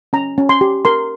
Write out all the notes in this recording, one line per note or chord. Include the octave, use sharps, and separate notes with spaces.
C#4 A#5
C#4
C6
G4
A#4 C6